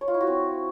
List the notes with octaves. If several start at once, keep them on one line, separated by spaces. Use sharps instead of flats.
C#5
F4
E4
F#4
C4